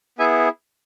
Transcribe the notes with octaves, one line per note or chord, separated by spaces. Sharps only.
B3 E4 G#4 E5 G#5